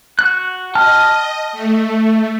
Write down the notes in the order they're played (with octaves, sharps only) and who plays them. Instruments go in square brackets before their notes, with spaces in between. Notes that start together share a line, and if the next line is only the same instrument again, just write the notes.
[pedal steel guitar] F#4 F#6
[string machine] D#5 [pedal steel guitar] G5 A5 F6
[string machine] A3